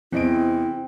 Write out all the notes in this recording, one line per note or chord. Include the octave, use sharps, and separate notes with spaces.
E2 C4 E4 D#5 D7